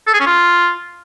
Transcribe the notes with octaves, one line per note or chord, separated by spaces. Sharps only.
A4
G#4
C#4
F4